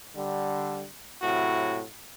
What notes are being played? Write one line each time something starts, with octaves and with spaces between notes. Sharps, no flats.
D3 G3
A2 C3 F#3 E4 F#4